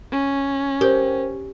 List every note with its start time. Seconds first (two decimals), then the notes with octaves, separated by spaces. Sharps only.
0.12 C#4
0.81 G4 A#4 C5